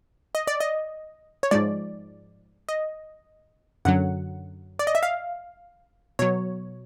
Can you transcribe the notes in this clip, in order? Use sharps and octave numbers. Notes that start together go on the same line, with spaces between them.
D#5
D5
D#5
C#5
G#2 F3 G#3 D5
D#5
F#2 D3 F#3 F#5
D5
D#5
E5
F5
B2 F#3 C#5